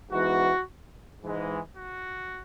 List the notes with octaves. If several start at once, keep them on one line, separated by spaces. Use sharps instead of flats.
G#2 E3 B3 F#4
G#2 E3 G#3
F#4